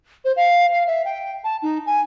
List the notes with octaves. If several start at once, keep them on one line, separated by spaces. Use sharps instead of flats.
C5
F5
F5
E5
G5
A5
D#4
G#5